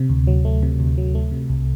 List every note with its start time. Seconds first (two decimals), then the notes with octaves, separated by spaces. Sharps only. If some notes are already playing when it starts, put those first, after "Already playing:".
Already playing: C3
0.09 D2
0.27 F#3
0.45 A3
0.63 C3
0.80 D2
0.98 F#3
1.15 A3
1.31 C3
1.49 C2